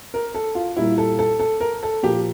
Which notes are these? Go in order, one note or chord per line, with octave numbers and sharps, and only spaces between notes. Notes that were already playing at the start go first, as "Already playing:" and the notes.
A#4
A4
F4
A#2 G3 A#3 E4
A4
A4
A4
A#4
A4
A#2 F3 A#3 G4